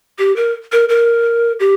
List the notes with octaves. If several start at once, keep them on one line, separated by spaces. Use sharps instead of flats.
G4
A#4
A#4
A#4
G4